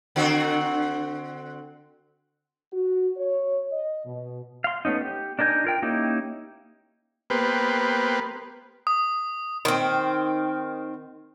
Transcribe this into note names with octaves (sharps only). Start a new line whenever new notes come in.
D3 C4 F#4
F#4
C#5
D#5
B2
F5 C6
A3 B3 C#4 D#4
G4
D4 D#4 A#4 G#5 G6
F4 A#4 G5
A#3 C#4 D#4 E4 G4
A#3 B3 G4 B4 C5
D#6
D#3 C4